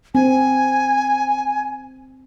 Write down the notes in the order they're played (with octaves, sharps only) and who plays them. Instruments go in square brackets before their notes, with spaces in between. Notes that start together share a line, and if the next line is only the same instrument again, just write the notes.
[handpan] C4 [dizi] G#5